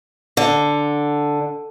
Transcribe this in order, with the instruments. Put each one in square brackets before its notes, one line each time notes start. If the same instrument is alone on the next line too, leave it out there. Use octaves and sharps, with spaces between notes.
[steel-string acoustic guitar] D3